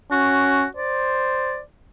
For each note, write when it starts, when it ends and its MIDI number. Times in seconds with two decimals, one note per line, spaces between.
0.12 0.66 61
0.12 0.66 66
0.77 1.61 72
0.77 1.61 74